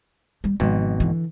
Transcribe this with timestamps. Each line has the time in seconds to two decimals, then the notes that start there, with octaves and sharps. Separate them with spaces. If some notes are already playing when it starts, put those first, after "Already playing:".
0.44 G3
0.60 G#1 B2 F3 G#3
1.00 D3 E3